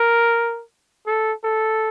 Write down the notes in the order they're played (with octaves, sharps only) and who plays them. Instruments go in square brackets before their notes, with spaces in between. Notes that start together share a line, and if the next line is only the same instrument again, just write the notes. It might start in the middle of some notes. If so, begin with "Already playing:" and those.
Already playing: [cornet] A#4
A4
A4